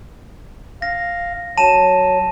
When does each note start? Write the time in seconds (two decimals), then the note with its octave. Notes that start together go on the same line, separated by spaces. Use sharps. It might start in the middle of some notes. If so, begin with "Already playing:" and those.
0.82 F5 A#6
1.57 F#3 A5 D#7 E7